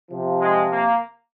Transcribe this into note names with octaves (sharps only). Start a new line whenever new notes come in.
C3 F3
G#3
A#3